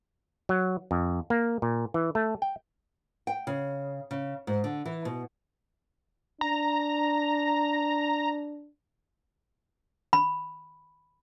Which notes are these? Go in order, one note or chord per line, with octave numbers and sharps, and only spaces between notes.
F#3
F2
A#3
A#2
E3
A3
G5
G5
C#3
C#3
G#2
D3
E3
B2
D4 A#5
B5